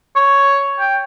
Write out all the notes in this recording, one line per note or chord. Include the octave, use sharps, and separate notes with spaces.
C#5
G5